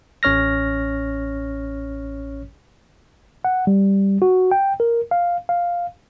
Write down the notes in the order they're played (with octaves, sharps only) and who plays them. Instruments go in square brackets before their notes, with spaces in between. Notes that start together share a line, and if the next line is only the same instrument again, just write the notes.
[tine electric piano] A1 C#4 C#5 F6 A#6
F#5
G3
F#4
G5
A#4
F5
F5